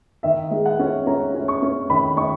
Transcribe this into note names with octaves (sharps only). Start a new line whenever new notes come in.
D#3 E5
G#3
F#5
C#4
C#4 A#5
C#4
C#6
C#4
D#3 B5
D#3 C#6